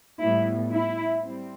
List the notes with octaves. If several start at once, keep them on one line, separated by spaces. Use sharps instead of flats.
A2 G3 B3 E4
E4
G3 C4